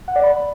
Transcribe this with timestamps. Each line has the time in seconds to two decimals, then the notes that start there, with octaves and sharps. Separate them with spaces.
0.08 F#5
0.16 D5
0.23 B5